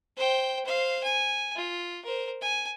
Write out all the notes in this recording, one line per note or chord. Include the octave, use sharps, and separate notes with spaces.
C5 G5
C5 F5
G#5
F4
A#4 C5
G#5